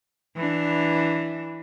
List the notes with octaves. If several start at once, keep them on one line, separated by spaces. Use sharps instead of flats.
E3 D4